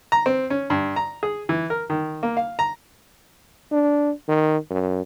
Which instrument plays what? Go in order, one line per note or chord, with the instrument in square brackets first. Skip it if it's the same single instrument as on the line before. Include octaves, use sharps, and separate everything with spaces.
[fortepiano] A#5
C4
C#4
G2
A#5
G#4
E3
A#4
D#3
A#3
F5
A#5
[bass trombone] D4
D#3
F#2